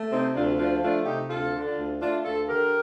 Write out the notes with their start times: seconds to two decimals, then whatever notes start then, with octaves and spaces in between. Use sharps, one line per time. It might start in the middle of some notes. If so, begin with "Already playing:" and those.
Already playing: A3
0.11 C3 C4 D#4
0.35 D2 D4 F4
0.58 F3 D4 F4
0.82 A3 D4 F4
1.06 C3 D#4 G4
1.30 D2 F4 A4
1.54 D3
1.66 D4 F4
1.77 D2
2.01 A3 D4 F4
2.24 D2 F4 A4
2.48 D3 G4 A#4